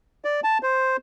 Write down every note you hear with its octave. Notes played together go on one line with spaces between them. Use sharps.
D5
A5
C5